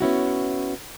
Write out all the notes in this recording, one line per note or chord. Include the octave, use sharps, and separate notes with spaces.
B3 C#4 E4 F#4